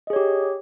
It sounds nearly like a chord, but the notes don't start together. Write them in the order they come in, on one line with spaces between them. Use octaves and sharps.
D#5 G#4 C#5 G4